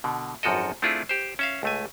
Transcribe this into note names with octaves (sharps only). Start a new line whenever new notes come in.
B2 D3
G#1 F#2 F3 F#4 A4 D#5
A3 C4 D4 E4 F4 G#4
G4 C5
C#4 E5 F5
C#2 A3 G#5